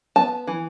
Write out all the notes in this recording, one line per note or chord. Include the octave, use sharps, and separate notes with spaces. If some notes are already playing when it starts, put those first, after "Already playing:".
B3 A5
E3